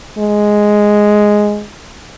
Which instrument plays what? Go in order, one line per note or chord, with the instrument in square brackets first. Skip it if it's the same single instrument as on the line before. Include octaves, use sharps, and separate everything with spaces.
[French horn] G#3